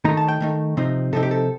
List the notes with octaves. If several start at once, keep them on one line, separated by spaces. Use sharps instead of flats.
D#3 A3 D#4 A#5
A5
G5
D#3 A3 D#4
C3 F3 C4 D#4
C3 F3 C4 D#4 A4
G4
A4